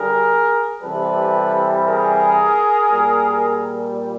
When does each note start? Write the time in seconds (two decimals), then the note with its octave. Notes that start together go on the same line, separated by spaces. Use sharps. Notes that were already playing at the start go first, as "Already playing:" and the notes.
Already playing: D3 G3 G#4 A#4
0.82 C3 E3 G3 A4 B4
1.86 G#4 A#4
2.89 A#2 G3